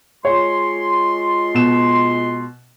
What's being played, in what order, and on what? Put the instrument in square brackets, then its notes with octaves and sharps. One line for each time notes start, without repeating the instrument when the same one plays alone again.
[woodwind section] G#3 F4 C6 [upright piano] C#5
[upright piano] B2 E7